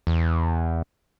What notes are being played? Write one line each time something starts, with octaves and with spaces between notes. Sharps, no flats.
E2